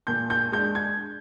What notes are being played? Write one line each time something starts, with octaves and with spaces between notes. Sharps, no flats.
A#2 G6
G6
G#3 D4 G6
G#6